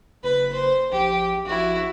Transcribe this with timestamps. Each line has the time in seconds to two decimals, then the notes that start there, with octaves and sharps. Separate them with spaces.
0.23 F#1 B4
0.53 C5
0.92 A#1 G4
1.46 A#1 E4 F#4